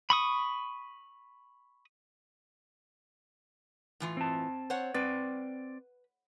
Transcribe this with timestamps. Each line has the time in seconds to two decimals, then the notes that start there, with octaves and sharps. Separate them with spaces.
0.10 B5 C#6 D#6
4.00 A2 E3 F4
4.17 C4 A5
4.70 C5 C#5 F#5
4.94 C4 B4 D5